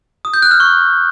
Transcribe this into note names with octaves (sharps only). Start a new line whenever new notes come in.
D#6
G6
F#6
F6
C#6